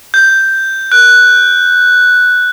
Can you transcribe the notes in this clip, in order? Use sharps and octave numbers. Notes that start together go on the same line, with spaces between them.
G6
F#6